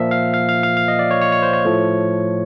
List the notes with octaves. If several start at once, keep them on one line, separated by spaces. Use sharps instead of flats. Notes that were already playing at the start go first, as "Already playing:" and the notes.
Already playing: A#2 F3 A#3 E5
F5
F5
F5
F5
F5
D#5
D5
C#5
C#5
C#5
C5
C#5
A2 F3 A3